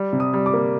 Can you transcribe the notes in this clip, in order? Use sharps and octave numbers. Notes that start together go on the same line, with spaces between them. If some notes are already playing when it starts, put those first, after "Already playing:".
Already playing: G3
C3
D#6
G3
D6
A#3